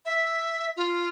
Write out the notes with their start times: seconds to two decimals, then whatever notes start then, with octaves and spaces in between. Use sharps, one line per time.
0.05 E5
0.77 F4